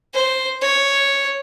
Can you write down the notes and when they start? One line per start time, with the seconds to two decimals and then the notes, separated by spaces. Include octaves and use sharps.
0.14 C5
0.61 C#5